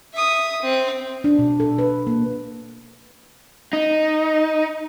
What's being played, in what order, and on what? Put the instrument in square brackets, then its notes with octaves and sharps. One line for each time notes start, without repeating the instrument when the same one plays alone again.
[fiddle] E5 D#6
C4
[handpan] D4
B2
A4
B4
A#3
[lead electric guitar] D#4